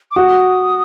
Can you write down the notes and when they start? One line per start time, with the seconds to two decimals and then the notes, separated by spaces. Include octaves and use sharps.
0.11 D6
0.16 F#4 D#6